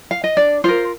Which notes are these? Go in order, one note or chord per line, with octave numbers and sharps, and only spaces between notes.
F5
D#5
D4 D5
F4 A#4 C5